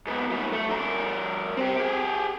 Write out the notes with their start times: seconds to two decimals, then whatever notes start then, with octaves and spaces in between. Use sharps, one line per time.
0.06 G#2 B3
0.31 A#2 G3
0.53 A3
0.69 G2 A#4
1.57 C4 G4
1.77 G4 G#4